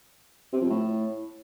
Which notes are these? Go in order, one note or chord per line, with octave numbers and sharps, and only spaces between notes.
C3
F2
A2